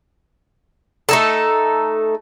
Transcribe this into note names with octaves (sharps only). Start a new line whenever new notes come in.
A3 D#4 A4